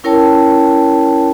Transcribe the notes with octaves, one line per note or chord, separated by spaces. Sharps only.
C#4 E4 A#4 C#5 G5 A5